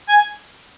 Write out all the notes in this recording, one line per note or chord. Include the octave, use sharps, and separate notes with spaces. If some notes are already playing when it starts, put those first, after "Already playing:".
G#5